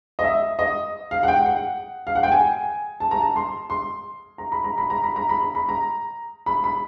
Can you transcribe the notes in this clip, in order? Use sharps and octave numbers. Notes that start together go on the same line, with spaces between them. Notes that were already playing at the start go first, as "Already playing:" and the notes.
D#5
E5
D#5
F5
F#5
G5
F#5
F5
F#5
G5
G#5
A5
A#5
A5
C6
C6
A#5
B5
A#5
B5
A#5
B5
A#5
B5
A#5
B5
A#5
B5
B5